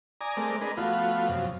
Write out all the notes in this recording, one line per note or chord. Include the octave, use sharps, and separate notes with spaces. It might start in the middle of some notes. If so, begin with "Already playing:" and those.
D5 G#5 A#5 D#6
G#3 A3 C4 A#4 D5
D4 G#4 A#4 B4 D#5 C6
F3 A3 B3 F4 F#4
F#2 C3 F3